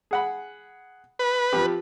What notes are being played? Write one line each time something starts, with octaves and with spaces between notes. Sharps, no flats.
G#4 F#5 B5
B4
F3 C4 G4